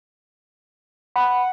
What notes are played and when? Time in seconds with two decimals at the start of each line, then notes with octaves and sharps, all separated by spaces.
1.16 F#5 B5